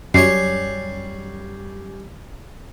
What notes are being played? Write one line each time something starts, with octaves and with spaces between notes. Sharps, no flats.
F#2 G3 C#4 C#5 C7